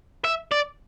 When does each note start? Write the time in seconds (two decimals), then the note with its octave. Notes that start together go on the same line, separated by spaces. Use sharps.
0.24 E5
0.51 D5